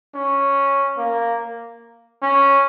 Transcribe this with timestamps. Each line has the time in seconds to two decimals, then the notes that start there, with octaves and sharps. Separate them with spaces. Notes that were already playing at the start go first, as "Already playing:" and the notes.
0.15 C#4
0.98 A#3
2.22 C#4